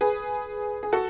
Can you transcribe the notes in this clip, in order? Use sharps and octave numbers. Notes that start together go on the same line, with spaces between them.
G#4 B4
G#4
F#4 A4